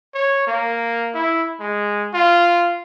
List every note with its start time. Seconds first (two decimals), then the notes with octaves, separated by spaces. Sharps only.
0.14 C#5
0.47 A#3
1.15 E4
1.60 G#3
2.14 F4